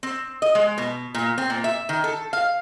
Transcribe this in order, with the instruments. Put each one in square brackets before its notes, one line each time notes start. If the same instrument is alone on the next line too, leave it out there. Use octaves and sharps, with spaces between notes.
[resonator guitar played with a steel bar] C4
D#5
G#3
B2
A#2
C4
A#2
E5
D#3
A4
F5